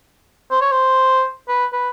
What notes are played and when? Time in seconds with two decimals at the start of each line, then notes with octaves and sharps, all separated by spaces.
0.51 C5
0.61 C#5
0.72 C5
1.49 B4
1.73 B4